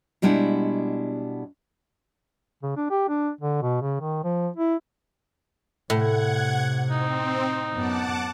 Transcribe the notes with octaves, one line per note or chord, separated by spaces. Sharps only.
B2 G3 G#3 D4 E4 F#5
C#3
D4
G4
D4
D3
B2
C#3
D#3
F3
E4
A2 C3 F#5 G#6
C4 D#4
F#2 B3 F#5 A5 D6